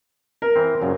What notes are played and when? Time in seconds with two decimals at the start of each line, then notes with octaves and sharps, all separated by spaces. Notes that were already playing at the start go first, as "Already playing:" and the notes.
0.42 A#4
0.56 E3 C4
0.82 F#2 A#2 C#3